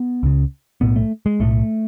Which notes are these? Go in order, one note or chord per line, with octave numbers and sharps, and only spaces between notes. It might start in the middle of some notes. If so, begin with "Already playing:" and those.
Already playing: B3
C#2 C#3
B1 A2 B3
A3
G#3
B1 A2 A3